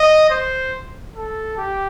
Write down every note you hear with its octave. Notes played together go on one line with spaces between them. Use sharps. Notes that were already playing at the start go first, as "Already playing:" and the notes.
Already playing: D#5
C5
A4
G4